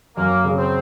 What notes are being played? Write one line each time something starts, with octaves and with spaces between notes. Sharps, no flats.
F#2 A#3
C#3
C4